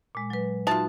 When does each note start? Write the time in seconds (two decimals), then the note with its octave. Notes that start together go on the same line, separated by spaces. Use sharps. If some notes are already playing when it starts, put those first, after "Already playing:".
0.15 A#2 G#3
0.30 F#3 B4
0.67 D#4 F4 F#4 E5 A5